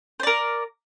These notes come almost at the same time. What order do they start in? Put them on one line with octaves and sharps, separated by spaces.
C5 D5 A#4